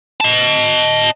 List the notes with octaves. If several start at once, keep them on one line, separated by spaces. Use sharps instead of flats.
D#5 A5